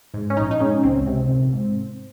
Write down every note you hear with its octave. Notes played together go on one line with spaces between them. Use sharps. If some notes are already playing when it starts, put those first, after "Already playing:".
G#2
C#4
A#1 D#4
D#4
G#2 C#4
C#2 C4
C3
A#1
G#2